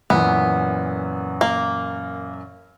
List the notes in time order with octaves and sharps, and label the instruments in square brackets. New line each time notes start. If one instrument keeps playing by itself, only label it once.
[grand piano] F#2 A#2 E3 [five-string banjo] B3
[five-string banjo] A#3